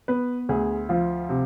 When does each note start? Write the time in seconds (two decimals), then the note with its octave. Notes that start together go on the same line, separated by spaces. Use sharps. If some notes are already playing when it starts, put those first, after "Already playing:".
0.08 B3 B4
0.49 D2 G#4
0.89 F3 F4
1.29 C3